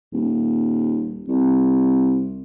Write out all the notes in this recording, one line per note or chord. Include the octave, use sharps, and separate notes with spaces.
D#1
C2